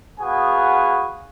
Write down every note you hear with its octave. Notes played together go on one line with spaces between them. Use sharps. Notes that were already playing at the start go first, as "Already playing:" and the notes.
B3 F#4 G#4 F5 F#5 G#5